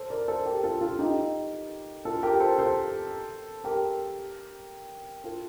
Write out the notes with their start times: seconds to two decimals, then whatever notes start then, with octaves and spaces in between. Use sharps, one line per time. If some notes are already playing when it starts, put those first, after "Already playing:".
Already playing: A4 C5
0.10 A#4 D5
0.28 A4 C5
0.46 G4 A#4
0.63 F4 A4
0.81 F4 A4
0.99 D#4 G4
2.05 F4 A4
2.23 G4 A#4
2.40 A4 C5
2.58 A4 C5
3.64 G4 A#4
5.24 F4 A4